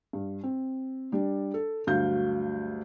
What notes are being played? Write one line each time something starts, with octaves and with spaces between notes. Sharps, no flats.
G2
C4
G3 D4
A4
D2 G2 F#3 F5 G6